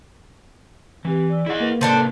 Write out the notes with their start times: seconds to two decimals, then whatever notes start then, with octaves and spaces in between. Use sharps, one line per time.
1.05 E3 C4 G4 B4
1.29 D5 E6
1.46 E4 G#4 D#5 F#5
1.60 A#3 B4
1.81 C3 D#3 D4 A4 C5